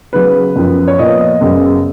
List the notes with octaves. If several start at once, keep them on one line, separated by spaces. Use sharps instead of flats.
C#3 F#3 B3 B4
F#2 F3 B3
C#5
A#2 F3 B3 D#5
F#2 C#3 F#3 B3